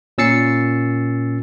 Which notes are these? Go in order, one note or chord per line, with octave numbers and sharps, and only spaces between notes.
A#2 C#4 E6 A6 C7 C#7